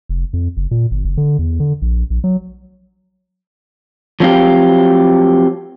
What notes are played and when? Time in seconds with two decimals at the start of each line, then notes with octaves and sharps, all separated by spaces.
0.09 F1
0.33 F2
0.57 F#1
0.71 A#2
0.91 G1
1.05 F#1
1.17 D3
1.39 E2
1.60 D3
1.82 A#1
2.10 A#1
2.24 F#3
4.20 F3 F#3 C4 F4 G4